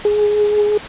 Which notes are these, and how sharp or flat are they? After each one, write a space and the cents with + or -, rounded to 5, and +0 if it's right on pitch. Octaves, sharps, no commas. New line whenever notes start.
G#4 +10